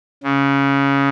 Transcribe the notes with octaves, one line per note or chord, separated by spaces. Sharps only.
C#3